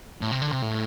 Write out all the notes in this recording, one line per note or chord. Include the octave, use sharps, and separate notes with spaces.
A2
C3
D3
C3
A2